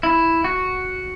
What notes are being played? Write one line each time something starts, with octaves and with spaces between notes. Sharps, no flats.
E4
F#4